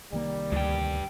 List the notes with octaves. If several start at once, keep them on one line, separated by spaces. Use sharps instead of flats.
C2 D#3 G3 A#3
D2 G2 G4